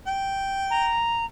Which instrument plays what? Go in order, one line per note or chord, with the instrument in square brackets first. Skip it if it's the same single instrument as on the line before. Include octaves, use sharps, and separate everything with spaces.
[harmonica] G5
[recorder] A#5